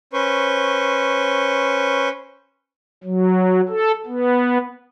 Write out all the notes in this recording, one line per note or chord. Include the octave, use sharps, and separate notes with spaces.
C#4 B4 C5 C#6
F#3
A4
B3